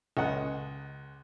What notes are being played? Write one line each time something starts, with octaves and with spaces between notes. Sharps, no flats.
C#2 D#5 F#5